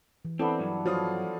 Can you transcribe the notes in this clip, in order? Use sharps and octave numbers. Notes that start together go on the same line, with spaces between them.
E3
B3 C4 D4 E4 A4
G2 F#3
F3 F4 F#4 C5 C#5 D#6